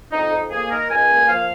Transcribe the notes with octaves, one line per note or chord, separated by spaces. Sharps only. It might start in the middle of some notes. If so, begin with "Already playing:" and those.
F2 D#4
F2
A#3 G#4
D#3 A#4
C#2 G#5
A#3
F3 F5